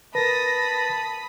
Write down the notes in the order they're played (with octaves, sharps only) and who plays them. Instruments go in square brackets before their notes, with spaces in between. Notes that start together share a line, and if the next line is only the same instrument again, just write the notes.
[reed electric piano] A#4 B4 [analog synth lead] A5 [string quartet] B5 D#6 [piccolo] A#6